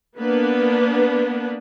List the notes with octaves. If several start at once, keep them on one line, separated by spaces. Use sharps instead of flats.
A#3 B3 D4 B4